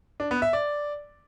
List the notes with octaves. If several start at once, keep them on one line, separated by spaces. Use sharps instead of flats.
D4
B3
E5
D5